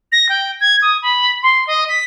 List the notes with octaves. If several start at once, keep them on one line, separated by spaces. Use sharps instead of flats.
A#6
G5
G#6
D#6
B5
C6
D#5
B6